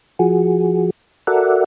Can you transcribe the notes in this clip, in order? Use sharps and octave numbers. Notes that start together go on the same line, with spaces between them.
F3 F#4 G#4
F#4 A4 A#4 D5 E5 F#5